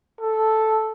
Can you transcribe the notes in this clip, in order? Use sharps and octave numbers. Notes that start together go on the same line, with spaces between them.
A4